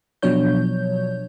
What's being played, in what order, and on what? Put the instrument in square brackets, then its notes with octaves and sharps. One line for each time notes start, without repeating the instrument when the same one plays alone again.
[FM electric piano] B2 F3 F#3 D4 C#5 G6